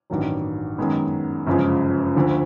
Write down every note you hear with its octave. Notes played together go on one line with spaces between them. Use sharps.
A1 G2 D#3 F#3
F#2 D#3 G#3 B3
G1 F#2 C#3 F3 G#3
D2 D3 F3